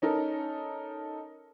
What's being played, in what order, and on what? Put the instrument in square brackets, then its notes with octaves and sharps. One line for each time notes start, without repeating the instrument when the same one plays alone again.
[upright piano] C#4 D#4 A4 A#4